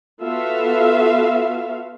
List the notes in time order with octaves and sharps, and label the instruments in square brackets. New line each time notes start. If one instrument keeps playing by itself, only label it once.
[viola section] B3 F4 F#4 A4 E5 F5